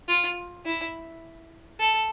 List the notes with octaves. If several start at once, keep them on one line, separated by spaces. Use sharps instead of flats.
F4
E4
A4